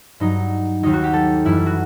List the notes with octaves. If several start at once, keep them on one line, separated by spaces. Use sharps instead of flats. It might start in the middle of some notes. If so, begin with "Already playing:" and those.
G2 F#3 D#4
D#2 D#3 F#3 D#4
F#4
G4
A4
F#2 E3 G3 E4
F#4